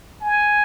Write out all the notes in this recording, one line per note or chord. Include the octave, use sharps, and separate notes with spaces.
G#5